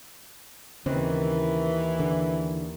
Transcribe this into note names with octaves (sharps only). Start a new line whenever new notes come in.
D#2 C#3 E3 C4
D3